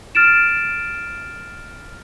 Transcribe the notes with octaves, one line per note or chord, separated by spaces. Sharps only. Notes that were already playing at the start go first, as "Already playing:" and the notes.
F6 A6 D7 E7